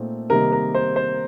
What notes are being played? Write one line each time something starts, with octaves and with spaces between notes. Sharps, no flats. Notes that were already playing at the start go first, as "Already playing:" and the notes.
Already playing: A#2 A3 C4 D#4
C3 D#3 G3 A#3 D#4 A#4
A#4
C5
C5